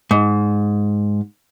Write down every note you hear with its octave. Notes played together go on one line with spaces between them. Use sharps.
G#2